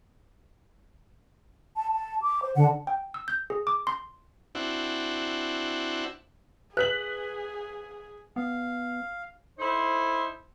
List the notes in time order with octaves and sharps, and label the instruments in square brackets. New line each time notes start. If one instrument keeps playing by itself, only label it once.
[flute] A5
A5
D6
C5
[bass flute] D3 [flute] F#5
[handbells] G5
E6
G6
G#4
D6
C6
[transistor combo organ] C4 D4 E4 F#4
[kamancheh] G#4 [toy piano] B4 [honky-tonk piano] F#6 B6 F#7
[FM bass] B3 [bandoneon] F5
[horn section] D#4 E4 A4 C5